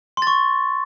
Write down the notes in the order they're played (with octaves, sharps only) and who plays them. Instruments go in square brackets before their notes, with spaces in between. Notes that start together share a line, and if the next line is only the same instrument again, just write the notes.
[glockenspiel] C6
A6
C#6